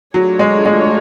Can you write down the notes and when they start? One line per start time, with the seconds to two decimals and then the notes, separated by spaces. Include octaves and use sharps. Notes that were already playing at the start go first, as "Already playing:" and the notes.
0.14 F#3 A3 D4 F4 G#4 C#5
0.39 G#3
0.66 G#3